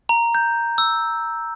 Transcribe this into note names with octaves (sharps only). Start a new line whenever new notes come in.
A#5
G6
E6